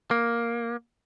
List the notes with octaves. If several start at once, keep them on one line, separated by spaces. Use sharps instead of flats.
A#3